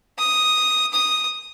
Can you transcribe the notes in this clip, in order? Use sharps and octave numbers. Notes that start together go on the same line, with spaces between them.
D#6
D#6